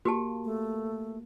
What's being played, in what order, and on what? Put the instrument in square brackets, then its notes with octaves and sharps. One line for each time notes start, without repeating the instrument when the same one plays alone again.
[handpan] A#3 [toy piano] F#4 G4 A5
[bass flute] A3